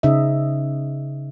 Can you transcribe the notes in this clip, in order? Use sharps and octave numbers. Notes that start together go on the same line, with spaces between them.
C#3 D#4 C5 D#5 E5